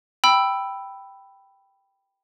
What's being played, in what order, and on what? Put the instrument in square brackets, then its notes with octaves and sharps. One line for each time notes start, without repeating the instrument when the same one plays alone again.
[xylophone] G5 B5 E6